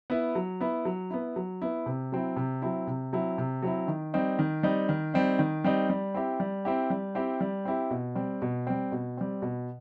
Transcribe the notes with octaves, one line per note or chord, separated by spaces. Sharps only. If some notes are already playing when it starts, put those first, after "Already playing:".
B3 E4
F#3
B3 E4
F#3
B3 E4
F#3
B3 E4
C3
F#3 C4 E4
C3
F#3 C4 E4
C3
F#3 C4 E4
C3
F#3 C4 E4
D#3
G3 C4 D#4
D#3
G3 C4 D#4
D#3
G3 C4 D#4
D#3
G3 C4 D#4
G3
C4 E4 G4
G3
C4 E4 G4
G3
C4 E4 G4
G3
C4 E4 G4
B2
G3 C4
B2
G3 C4
B2
G3 C4
B2